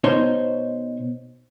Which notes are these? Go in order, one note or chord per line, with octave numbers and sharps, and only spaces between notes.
B2 D#4 C5 C#5